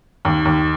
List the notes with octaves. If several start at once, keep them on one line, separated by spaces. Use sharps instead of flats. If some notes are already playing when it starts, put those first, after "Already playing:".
D#2
D#2